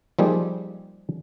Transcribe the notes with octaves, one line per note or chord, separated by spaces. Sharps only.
F3 G3 A#3 D#4 G#4